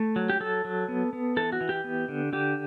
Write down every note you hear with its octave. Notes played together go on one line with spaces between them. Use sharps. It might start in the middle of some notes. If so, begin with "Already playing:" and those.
Already playing: A3
F#3
G4
F#3 A4
F#3
B3
B3
E3 A4
F#4
E3
G4
B3
D3
D3 G4